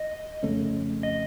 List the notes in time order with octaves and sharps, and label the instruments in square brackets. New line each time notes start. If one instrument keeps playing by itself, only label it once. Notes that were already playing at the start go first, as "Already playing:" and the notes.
Already playing: [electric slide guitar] D#5
[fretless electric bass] F2 C#3 A3 C#4
[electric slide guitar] D#5